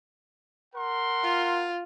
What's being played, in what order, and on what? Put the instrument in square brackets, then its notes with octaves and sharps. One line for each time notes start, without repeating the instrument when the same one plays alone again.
[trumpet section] A#4 F#5 C6
[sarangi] F4